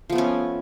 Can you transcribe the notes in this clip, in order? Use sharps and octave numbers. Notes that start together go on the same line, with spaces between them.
F3 A3 B3 C#4